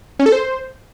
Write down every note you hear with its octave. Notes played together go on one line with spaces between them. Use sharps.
C#4
A4
C5